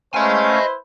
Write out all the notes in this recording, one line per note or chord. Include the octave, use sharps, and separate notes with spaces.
A3 C#4 E4 B4 C5 D#5 F5 G#5